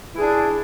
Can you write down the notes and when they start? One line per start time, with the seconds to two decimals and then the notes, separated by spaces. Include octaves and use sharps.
0.15 E4
0.18 G#4
0.21 D4